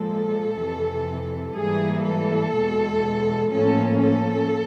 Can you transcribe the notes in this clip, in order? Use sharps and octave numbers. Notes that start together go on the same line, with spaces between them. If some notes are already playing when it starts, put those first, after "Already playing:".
Already playing: A#2 F3 G#3 A4
F2 C3 E3
G#2 E3 G3 A#3 G#4
A4
E2 B2 G#3
A2 F3 A#3 C#4 A4
A4